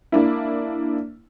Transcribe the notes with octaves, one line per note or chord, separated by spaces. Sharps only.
A#3 D4 E4